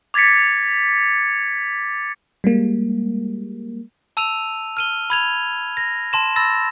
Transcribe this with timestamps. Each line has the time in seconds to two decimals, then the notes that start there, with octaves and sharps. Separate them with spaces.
0.14 D6 G#6 A6 B6 C#7
2.44 G3 G#3 A#3
4.17 A5 E6 D#7 F7
4.77 F6 D#7 G7
5.10 B5 G#6 F7
5.77 A#6
6.13 A5 C6 E7
6.36 B5 E6 A6 A#6